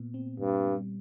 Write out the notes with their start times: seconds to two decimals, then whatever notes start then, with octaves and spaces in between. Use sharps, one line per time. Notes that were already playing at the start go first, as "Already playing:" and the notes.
Already playing: A#2 B3
0.14 C4
0.39 G2 A#2
0.65 G3